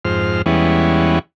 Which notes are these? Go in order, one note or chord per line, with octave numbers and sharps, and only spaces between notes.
F2 G#2 C5 F6
E2 E3 G3 G#3 B3 C#4